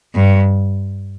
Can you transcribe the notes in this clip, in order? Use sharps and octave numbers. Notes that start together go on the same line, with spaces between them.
G2